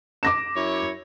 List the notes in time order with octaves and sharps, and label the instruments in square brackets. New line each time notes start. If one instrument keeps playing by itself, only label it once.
[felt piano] D6 A#6 E7
[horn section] F#2 E4 C#5